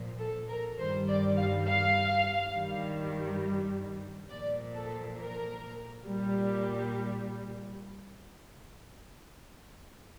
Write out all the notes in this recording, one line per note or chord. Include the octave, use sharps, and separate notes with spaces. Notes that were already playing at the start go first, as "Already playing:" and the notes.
Already playing: A#2 F3
A4
A#4
G2 D#3 G3 C5
D5
F5
F5
G2 D#3 G3
A#2 F3 D5
A4
A#4
A#2 G3